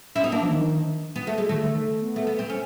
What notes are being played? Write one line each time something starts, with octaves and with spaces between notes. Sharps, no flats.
C#4 E4
B3 D#4
A#3 D4
F3
D#3
B3
A3
G#3
D#3 A3
D3
D#3
B3
A3
B3
C4
C#4